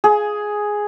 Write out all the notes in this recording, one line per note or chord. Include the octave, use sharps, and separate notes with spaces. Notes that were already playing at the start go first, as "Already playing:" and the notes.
G#4